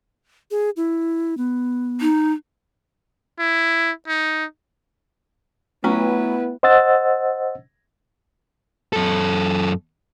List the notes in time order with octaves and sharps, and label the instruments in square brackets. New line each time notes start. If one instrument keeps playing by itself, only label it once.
[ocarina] G#4
E4
B3
[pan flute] D#4
[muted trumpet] E4
D#4
[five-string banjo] F#3 C#4 [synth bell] A3 [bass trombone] B3 [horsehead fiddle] E4 B4
[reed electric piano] C5 D#5 F#5 E6 A6
[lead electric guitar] F#2 A4